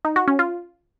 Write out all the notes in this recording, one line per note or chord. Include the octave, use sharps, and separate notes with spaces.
D#4
F#4
C#4
F4